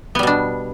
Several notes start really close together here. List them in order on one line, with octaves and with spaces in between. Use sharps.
B3 G3 B2 D4